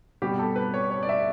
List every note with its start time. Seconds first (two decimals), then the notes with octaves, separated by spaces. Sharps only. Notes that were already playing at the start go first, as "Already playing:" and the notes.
0.22 B2 G3 B3 G4
0.39 A4
0.56 B4
0.74 C#5
0.91 C#5
1.03 D5
1.09 E5